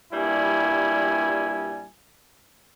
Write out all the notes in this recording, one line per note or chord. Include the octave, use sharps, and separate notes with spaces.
G2 A#2 G3 E4 G#5